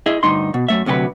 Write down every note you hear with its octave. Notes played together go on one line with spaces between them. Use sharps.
E4 G#4 D#5 E5
D2 G2 D#4 C6
B2
F#2 A3 E5
D2 C3 F#3 G4 B4